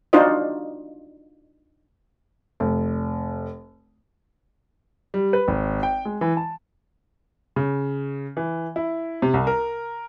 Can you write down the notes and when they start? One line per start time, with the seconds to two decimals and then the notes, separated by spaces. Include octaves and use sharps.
0.13 D4 D#4 F4 F#4 C5 D#5
2.60 F1
5.14 G3
5.33 B4
5.48 G#1
5.83 G5
6.05 G#3
6.21 E3
6.37 A5
7.56 C#3
8.37 E3
8.76 E4
9.22 C3
9.34 C2
9.47 A#4